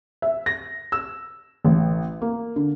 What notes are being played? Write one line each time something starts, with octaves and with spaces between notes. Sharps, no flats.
E5
A#6
E6
A1
A#3
D3